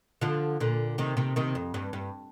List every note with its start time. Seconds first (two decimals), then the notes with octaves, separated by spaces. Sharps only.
0.21 D3 F3
0.60 A#2 D3
0.98 C3 D#3
1.17 C3 D#3
1.36 C3 D#3
1.55 F2
1.74 G2
1.93 G2